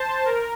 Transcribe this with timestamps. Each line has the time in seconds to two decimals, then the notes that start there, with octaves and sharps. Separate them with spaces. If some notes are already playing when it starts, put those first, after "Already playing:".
Already playing: C5 A5
0.25 A#4